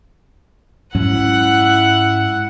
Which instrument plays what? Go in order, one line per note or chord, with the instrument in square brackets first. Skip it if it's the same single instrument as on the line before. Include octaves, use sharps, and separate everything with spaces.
[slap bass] G#2 F#3 C#4 [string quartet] E4 F#5 F#6